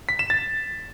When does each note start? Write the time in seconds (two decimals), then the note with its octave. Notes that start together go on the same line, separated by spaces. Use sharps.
0.09 B6
0.19 E7
0.30 A6